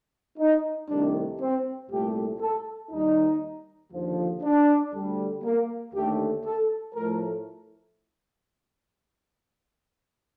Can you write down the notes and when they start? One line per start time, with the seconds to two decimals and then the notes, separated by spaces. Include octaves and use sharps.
0.39 D#4
0.89 C2 C3 D#3 A3 D4
1.40 C4
1.90 C2 A#2 A3 G4
2.40 A4
2.91 D#2 D#3 G3 D#4
3.92 D#2 D3 F3
4.42 D4
4.93 D2 D3 G3
5.43 A#3
5.93 D#2 D3 A3 G4
6.44 A4
6.94 A2 F3 A3 A#4